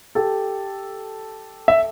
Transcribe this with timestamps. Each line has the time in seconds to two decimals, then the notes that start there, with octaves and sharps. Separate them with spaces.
0.15 G4 A4
1.68 E5